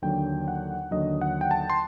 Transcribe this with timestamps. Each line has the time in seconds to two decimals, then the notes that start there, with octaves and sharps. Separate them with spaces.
0.02 D#2 D3 F#3 G5
0.48 F#5
0.91 D#2 D3 F#3 D#5
1.21 F#5
1.41 G5
1.51 A5
1.70 C6